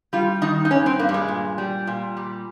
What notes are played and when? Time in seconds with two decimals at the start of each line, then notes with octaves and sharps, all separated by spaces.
0.13 G3 F4
0.42 D#3 D#4
0.65 D#4
0.71 G2 C#4
0.86 C4
0.99 G2 A#3
1.09 G3
1.14 G#3
1.28 A#2
1.58 G3
1.87 A#2
2.17 G3